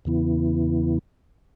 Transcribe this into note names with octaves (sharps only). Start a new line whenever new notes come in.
E2 C#3 E3 B3 E4